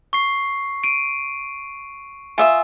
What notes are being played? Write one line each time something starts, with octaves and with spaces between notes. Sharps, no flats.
C#6 C7
D7 D#7
F4 E5 G#5 D#6